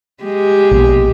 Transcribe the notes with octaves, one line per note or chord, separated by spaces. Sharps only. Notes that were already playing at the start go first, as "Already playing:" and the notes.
G#3 G4
A#1 B2